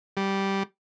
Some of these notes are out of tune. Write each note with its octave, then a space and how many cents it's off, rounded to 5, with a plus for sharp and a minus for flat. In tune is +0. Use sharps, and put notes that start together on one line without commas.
G3 -5